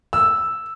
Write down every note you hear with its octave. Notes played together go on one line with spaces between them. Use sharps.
E6